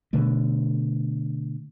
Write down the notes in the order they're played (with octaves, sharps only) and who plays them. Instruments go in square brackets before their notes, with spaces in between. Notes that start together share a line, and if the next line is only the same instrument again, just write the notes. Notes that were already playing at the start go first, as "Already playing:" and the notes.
[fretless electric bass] B2 D3 A3